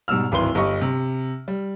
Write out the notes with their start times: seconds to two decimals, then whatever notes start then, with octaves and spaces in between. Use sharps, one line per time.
0.08 G#2 B2 G3 E6 F6
0.32 D1 G#1 E3 B4 C6 G7
0.55 G1 G4 D#5 C#6
0.81 C3
1.48 G3